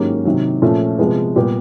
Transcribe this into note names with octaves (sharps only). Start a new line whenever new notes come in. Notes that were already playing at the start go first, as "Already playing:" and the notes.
Already playing: G#2 D#3 F#3 A#3 C#4 G4
C3 D#3 F#3
A#2 F3 A3 C#4
C3 F3 G#3 B3
A#2 G3 B3 G4